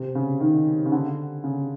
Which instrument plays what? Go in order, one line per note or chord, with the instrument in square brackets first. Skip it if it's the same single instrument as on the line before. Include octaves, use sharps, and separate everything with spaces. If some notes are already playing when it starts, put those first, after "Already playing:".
Already playing: [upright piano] C3
C#3
D#3
C#3
D3
C#3